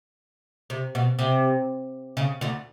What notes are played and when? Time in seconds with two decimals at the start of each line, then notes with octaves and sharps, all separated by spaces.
0.70 C3
0.95 B2
1.19 C3
2.17 C#3
2.41 D2 D3